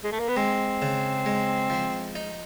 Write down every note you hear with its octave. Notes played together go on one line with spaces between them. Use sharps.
G#3
A3
A#3
B3
G#3 C4
C#3
G#3
F3
D#4